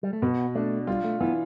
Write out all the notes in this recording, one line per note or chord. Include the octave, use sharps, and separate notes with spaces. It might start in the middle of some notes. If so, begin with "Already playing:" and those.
G3
A3
B2 B3
A3 D4
G3 F4
A3
E3 B3